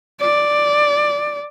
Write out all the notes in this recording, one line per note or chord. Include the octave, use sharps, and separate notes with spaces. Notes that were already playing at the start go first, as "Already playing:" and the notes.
D5